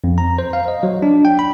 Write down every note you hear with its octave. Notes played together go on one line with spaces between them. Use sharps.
F2
A#5
C5
F5
D#5
F#3
D4
G5
B5